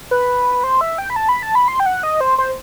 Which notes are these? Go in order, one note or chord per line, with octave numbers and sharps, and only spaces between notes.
B4
C5
E5
G5
B5
A5
B5
A5
B5
C6
G5
F#5
D#5
C5
C5